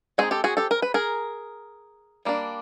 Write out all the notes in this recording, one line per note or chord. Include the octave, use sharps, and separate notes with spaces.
G#3 C4 D#4 F#4 G#4
G4 A4
F#4 G#4
G4 A4
A#4
B4
G#4 A#4
G3 A#3 D4